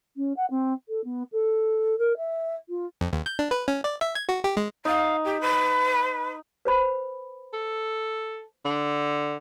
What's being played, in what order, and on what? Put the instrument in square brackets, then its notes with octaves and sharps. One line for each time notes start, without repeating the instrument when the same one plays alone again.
[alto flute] C#4
F#5
C4
A4
B3
A4
A#4
E5
F4
[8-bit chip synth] F2
D#2
G6
D4
B4
C#4
D5
E5
G#6
F#4
G4
G#3
[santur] D#4 [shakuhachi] F5
[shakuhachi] G4
B4
[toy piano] B4 C5 B5
[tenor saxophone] A4
D3